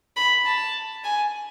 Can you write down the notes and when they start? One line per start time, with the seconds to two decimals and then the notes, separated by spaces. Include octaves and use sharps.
0.17 B5
0.45 A5
1.04 G#5